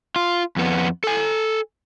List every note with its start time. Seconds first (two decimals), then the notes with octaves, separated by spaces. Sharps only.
0.16 F4
0.56 F2 B3
1.04 A4 G#5